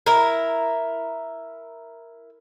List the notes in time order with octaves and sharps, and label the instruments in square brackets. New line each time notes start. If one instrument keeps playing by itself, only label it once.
[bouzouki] E4 A#4